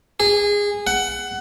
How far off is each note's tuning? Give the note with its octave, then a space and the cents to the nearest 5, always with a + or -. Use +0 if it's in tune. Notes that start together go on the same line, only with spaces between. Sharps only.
G#4 -20
F#5 +20